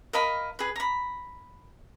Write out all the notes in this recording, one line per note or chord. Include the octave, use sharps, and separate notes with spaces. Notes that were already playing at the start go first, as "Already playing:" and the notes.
A#4 D#5 F5 B5
G#4 B4
A#5 B5